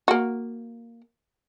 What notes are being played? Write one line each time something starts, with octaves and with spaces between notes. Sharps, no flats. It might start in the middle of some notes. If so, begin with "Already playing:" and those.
A#3 F#4